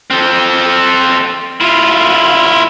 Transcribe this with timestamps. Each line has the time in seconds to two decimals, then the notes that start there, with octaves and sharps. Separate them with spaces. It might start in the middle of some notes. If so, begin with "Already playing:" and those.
0.10 C4 A4
1.61 E4 F4